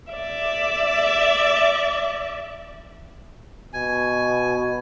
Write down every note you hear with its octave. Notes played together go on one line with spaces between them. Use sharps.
D5 E5
B2 G#5